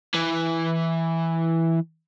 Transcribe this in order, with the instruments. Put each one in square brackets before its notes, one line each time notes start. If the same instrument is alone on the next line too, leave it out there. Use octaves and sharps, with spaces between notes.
[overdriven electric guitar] E3